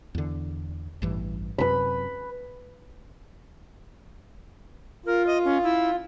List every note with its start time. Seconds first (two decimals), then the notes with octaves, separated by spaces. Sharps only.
0.15 E2 D3
1.02 A1 G2 E3
1.58 F#2 C3 B4 B5
5.06 F4 A#4
5.27 D#5
5.45 C#4
5.63 E4